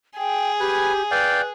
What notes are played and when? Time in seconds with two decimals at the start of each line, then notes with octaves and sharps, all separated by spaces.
0.17 G#4 G5
0.60 G4 B4 G#5
1.11 B4 D5 F5 G5